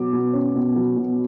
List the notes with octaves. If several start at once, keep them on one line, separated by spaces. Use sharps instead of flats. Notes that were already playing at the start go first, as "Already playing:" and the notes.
Already playing: B2 F#3 D6
B2
C#4
B2
F#3
B2